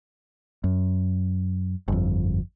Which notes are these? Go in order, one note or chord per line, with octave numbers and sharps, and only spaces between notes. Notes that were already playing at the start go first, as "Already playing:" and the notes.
F#2
G1 F2